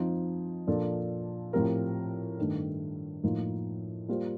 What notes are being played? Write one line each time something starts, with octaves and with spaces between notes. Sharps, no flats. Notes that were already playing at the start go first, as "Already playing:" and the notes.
Already playing: F3 C4 D#4
A#2 F3 A#3 D4 A4
A2 F3 C4 G4 A#4
G2 D#3 A3
A2 F3 A#3 D#4 A#4
G3 A#3 F4 C5